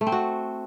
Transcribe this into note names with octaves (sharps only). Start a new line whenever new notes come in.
A3
C4
F#4